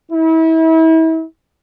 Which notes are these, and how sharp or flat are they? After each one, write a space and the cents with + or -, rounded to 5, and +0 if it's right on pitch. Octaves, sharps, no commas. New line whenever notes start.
E4 -35